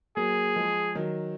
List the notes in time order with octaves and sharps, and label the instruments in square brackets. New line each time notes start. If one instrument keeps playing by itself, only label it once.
[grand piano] F#3 A#3 [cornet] G#4
[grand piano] F3 G#3
D#3 F#3